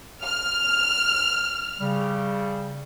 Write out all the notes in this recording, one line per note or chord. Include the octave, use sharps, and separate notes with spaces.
F6
C#3 G3